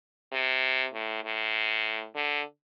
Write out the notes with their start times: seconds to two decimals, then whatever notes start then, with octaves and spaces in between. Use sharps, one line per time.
0.32 C3
0.94 A2
1.24 A2
2.15 D3